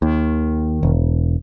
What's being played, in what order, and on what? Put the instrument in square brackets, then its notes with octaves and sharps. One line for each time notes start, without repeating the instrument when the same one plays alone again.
[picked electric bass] D#2 [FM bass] D#3
[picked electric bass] E1